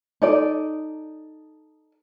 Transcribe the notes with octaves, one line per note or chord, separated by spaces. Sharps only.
D#4 A4 D5